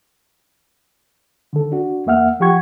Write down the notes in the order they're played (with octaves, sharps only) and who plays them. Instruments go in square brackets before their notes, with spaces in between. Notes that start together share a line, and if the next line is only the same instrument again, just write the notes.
[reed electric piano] D3 D#3 A4
D4 F#4
E2 A#3 E5 F#5 F6
F3 F4 G4 F#5 C#6 G#6